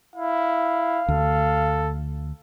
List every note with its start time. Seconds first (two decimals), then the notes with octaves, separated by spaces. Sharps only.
0.16 E4 F5
1.08 D2 A4